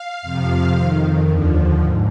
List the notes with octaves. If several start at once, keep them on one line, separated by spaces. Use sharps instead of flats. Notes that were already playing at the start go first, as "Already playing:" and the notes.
Already playing: F5
F2 C3 F3
F2 D#3
D#2 D3 F3
G#2